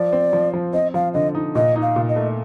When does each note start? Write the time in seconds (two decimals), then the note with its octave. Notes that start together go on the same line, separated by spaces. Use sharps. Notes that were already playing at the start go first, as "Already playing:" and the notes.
Already playing: F3 D5
0.13 C4
0.33 F3
0.53 F3
0.73 C4 D#5
0.94 F3 F5
1.14 D3 D#5
1.35 D#4
1.55 A#2 D#5
1.76 D#4
1.82 F5
1.96 A#2
2.09 D#5
2.16 A3